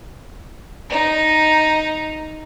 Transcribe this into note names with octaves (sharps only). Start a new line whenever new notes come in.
D#4 A#5